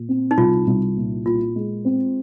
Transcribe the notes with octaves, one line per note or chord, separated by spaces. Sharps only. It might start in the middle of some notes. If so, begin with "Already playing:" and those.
Already playing: A#2
C4
D#4
C2 F4
C2
A#2
A#2 F4
G#3
C4